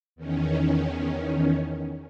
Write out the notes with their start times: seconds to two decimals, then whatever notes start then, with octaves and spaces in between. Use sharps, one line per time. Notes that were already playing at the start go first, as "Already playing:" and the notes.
0.16 E2 D#3 C#4